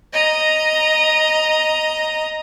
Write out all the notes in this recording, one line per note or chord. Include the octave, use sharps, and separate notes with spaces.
D#5 A#5